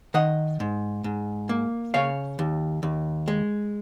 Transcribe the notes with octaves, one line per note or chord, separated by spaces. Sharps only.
D#3 D#5 F#5
G#2
G#2
A#3
C#3 C#5 F5
D#2
D#2
G#3